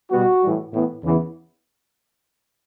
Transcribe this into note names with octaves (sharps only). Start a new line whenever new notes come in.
B2 G3 B3 F#4
A2 E3 G3
A2 E3 B3
E2 C#3 E3 B3